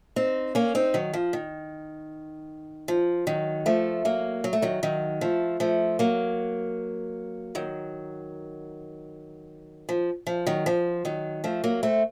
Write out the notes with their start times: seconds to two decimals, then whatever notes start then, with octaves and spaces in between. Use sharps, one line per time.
0.16 C4 D#4
0.55 A#3 C#4
0.75 C4 D#4
0.94 D#3 F#3
1.14 F3
1.33 D#3
2.88 F3
3.27 D#3 F#3
3.66 F3 A3
4.05 F#3 A#3
4.44 F#3
4.53 A3
4.62 D#3 F#3
4.83 D#3 F#3
5.21 F3 A3
5.60 F3 A3
5.99 F#3 A#3
7.55 D#3 F#3
9.89 F3
10.27 F3
10.47 D#3 F#3
10.66 F3
11.05 D#3 F#3
11.44 F3 A3
11.64 F#3 A#3
11.83 A3 C4